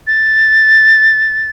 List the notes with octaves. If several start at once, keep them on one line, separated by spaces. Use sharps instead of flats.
A6